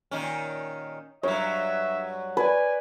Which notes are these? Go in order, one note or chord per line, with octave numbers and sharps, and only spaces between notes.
A#2 D#3 C#4
G2 F#3 C#5 E5
B4 D5 G#5